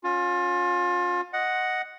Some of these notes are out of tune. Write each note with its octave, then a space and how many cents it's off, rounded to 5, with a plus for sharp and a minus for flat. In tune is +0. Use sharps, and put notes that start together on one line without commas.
C#4 +0 F4 +30
D#5 +0 F#5 +0